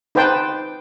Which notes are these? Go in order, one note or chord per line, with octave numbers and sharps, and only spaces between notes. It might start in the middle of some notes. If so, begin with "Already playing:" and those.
D#4 B4 C5 G5 A5